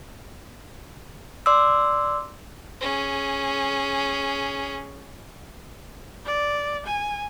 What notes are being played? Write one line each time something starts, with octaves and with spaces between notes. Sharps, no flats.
D5 C6 D6 E6
C#4 G#4
D5
G#5